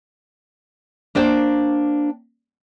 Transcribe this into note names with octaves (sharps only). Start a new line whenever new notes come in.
A#3 D4 C5 G5